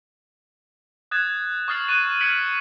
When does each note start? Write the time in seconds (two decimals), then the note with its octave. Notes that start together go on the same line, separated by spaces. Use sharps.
1.11 D#6 F#6 G#6 A6 E7
1.68 C#6 D#6 F6 A6 C7 F#7
1.88 C#6 F#6 A6 D#7 E7
2.20 F6 G#6 B6 C#7 D7 F#7